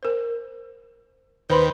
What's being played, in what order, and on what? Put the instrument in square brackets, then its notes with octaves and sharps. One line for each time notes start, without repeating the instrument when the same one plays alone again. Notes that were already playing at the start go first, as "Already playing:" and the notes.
[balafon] A#4 C5
[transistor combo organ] D#2 D#3 G5 [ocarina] B4 [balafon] C5 B5 C6